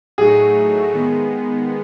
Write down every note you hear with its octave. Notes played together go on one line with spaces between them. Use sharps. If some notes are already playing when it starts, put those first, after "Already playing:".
A2 F#3 A3 D#4 F#4 G#4
D#3 G#3 B3